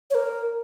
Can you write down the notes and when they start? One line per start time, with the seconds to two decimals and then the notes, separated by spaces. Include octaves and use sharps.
0.11 C#5
0.15 A#4